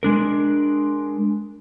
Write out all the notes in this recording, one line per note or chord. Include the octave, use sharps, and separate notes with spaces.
G#3 D4 A#4